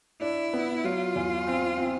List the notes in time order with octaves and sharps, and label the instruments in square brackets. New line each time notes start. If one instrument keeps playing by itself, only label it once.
[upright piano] D4 [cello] E4
[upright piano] B3
[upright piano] F#3 [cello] F4
[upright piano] E2
C4
C4